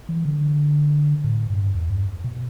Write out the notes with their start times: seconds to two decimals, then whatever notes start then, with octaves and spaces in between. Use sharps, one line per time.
0.09 E3
0.25 D3
1.24 A2
1.50 G2
1.75 E2
1.90 G2
2.24 B2